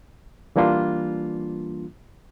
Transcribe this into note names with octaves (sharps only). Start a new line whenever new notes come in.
E3 G3 A#3 D4 F4